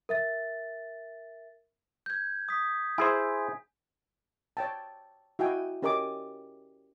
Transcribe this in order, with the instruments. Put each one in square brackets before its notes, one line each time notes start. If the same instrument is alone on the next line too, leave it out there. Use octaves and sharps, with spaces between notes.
[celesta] A#4 E5 A6
[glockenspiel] G6 G#6
D#6 B6
[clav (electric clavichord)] E4 G#4 C5 [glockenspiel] G#5
[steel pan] C#5 G5 A5
E4 F#4 D#5 G5 G#5
C#4 G4 A#4 D#5 G#5 D6